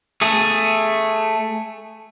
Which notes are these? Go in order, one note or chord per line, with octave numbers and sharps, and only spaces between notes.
A3 G#4